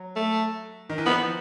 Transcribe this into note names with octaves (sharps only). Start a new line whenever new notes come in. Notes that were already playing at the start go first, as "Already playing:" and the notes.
Already playing: F#3
A3
D#3
E3
F3 B3